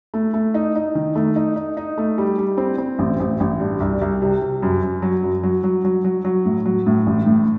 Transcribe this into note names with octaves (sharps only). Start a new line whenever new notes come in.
A3
A3
D#4
D#4
D#3
A3
D#4
D#4
D#4
A3
G3
G3
C4
C4
A1
A1
A1
G2
C2
C2
C3
C3
F#2
F#2
F#3
F#2
F#3
F#3
F#3
F#3
F#3
A2
F#3
A2
A1
A2